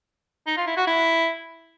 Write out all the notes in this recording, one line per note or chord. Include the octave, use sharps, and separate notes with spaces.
D#4
F4
E4
F#4
E4